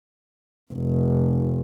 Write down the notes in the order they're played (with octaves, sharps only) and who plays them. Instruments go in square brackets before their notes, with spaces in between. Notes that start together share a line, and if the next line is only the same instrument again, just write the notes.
[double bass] F1